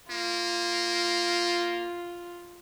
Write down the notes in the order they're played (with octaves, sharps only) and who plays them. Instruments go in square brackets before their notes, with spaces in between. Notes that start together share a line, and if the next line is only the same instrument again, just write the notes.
[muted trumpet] A#3 [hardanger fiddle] F4